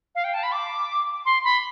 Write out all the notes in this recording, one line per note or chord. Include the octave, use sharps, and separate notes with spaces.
F5
G5
A5
B5
D6
C6
B5